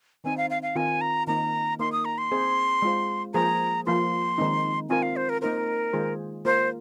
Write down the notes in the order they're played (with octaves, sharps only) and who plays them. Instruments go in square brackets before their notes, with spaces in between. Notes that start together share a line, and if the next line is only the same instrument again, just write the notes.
[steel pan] D#3 C4 D#4 C5 [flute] G#5
[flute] F5
F5
F5
[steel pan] D#3 C4 F4 A#4 [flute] G#5
[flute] A#5
[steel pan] D#3 A#3 D#4 C5 [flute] A#5
[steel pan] A#3 D#4 A#4 [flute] C6
[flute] D#6
A#5
C6
[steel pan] C4 G#4 C5
G#3 F4 C5
[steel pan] F3 A#3 G#4 C5 [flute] A#5
[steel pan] F3 A#3 F4 [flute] C6
[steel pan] D#3 G#3 C4 D#4
[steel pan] C4 F4 A#4 [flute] G#5
[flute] F5
C5
A#4
[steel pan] A#3 D#4 C5 [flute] A#4
[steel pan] D#3 G#3 F4 G#4 C5
[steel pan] A#3 F4 A#4 [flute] C5